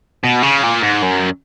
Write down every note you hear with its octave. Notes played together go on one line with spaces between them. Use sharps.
B2
C#3
A#2
G#2
F#2